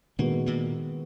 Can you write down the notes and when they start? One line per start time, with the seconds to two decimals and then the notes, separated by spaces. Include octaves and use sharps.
0.19 A#2 D#3 G#3 A#3 B3 F#4
0.46 A#2 A#3